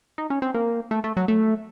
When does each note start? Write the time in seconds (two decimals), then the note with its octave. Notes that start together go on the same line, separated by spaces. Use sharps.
0.18 D#4
0.30 C#4
0.42 C4
0.54 A#3
0.91 A3
1.04 A3
1.17 F#3
1.28 A3